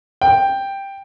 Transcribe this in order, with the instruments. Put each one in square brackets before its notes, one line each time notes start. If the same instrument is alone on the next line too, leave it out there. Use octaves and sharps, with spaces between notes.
[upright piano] G5